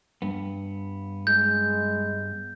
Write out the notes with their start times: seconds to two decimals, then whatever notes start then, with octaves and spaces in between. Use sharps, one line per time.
0.22 G2 B3
1.27 G#3 G6